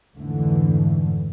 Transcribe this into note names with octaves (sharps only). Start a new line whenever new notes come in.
F2 G#2 D3 E3 A3